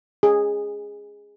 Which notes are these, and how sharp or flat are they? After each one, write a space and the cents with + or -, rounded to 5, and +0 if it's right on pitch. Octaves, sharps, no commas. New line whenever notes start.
G#4 -10